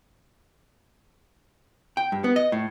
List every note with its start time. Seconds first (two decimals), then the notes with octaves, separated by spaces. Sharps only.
1.97 G5
2.12 G2
2.24 B3
2.36 D#5
2.52 A2